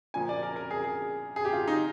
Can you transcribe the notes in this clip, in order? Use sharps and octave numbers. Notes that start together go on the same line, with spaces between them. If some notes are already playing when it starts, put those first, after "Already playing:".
A#2 F3 A#3 G#5
D5
A#4
A#4
G#4
G#4
G#4
G4
F4
D#4